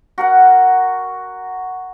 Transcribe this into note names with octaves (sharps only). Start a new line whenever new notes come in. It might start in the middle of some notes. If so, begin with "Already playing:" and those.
F#4 A#4 F#5